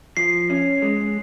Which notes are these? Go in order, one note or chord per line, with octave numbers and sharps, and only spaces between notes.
F3 C7
C#4
G#3